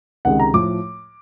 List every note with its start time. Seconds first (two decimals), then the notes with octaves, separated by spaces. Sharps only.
0.25 C#2 C3 D#3 G#3 F#5
0.40 A#5
0.54 A2 F3 A3 D6